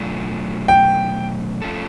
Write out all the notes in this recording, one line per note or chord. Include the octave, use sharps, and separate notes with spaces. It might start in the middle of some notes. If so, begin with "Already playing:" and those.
Already playing: B2 F#3 A3 D4 F4
G5
F3 A3 C#4 F4 A4